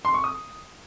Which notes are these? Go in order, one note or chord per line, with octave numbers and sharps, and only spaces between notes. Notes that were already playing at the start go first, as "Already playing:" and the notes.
C6
C#6
D#6